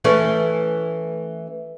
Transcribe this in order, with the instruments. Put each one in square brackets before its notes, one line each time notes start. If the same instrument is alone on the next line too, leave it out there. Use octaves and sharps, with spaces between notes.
[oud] E3 A3 C#4